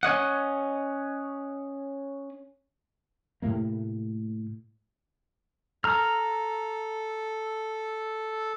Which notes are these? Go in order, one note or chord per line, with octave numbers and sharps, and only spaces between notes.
C#4 C#5 D#5 F#5
A2 C3 A3 A#3
A4 A#5 F6